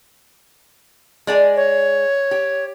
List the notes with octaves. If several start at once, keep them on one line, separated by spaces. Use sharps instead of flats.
G#3 D5 G#5
C#5
G4